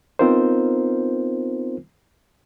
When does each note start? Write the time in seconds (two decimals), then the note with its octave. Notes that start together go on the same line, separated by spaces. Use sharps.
0.19 B3 C4 D#4 F4 A#4 C5